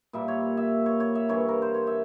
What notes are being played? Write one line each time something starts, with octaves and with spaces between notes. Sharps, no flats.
A#2 G3 A#3 E5
C#5
E5
C#5
C#5
E5
G2 E3 A#3 C#5
A#4
C5
C#5
E5